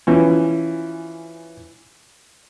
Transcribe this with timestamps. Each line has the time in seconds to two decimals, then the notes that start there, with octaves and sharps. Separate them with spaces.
0.07 E3 F3 C#4